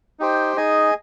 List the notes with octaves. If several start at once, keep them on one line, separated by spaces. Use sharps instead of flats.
D#4 G4 C5 G5
D#4 G#4 D#5 G#5